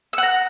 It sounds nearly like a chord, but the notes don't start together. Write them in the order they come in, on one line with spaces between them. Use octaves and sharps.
E6 F#5 A#5